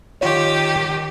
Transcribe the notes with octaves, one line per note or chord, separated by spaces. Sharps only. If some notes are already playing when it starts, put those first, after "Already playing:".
D#3 F4 G4 C#5